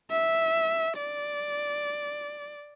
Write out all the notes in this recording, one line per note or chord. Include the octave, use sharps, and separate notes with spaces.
E5
D5